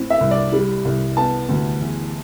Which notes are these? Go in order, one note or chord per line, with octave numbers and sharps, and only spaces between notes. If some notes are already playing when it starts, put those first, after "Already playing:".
Already playing: A2 C4
E5
C2
D5
G3
C2
B3 A5
D2
E2